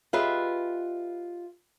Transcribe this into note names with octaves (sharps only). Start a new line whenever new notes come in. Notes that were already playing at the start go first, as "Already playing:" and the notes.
F4 G4 G#4 B4 D#5 E5